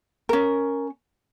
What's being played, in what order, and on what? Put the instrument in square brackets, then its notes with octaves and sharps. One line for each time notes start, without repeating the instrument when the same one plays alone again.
[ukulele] C#4 A#4